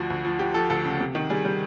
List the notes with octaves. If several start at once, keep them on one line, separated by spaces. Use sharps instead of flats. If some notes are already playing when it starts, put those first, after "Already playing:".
Already playing: D2 F3 F#4
D2
F3
F3 G4
F3 A4
D2 A4
C#3
C3
D#3
G3 G#4
G3